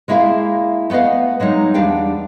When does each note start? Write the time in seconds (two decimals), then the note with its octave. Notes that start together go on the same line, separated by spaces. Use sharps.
0.08 G#3 A#3 E4 G#4 E5 F5
0.90 A3 B3 B4 D#5 F5
1.40 F#3 G#3 A#3 D#4
1.74 E2 G3 D4 F5 G5